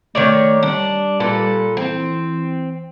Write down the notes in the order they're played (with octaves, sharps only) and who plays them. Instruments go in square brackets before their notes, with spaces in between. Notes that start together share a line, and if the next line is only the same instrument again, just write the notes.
[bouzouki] D#3 C#5 D5 [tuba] A3
[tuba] G3 [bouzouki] D4
[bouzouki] A#2 A4 B4
[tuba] E3 [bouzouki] C4